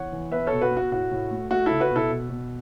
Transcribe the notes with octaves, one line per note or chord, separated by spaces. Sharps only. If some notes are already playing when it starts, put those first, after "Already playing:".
Already playing: E2 C#5 F#5
E3
B3 B4 E5
A4 C#5
B2
F#4 B4
B3
F#4
A2 F#4
A2
A3
A3 F#4
C#2 E4 A4
F#4 B4
B2 E4 A4
B2
B2